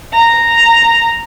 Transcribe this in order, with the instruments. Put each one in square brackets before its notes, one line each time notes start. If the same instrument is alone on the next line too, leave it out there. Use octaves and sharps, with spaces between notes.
[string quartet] A#5